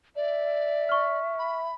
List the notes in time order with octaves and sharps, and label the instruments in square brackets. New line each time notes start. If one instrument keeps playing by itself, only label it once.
[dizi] D5 [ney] E5
[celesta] C#6 F6
[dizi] B5